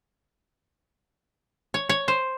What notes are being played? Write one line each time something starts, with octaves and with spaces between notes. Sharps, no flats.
C#5
C#5
C5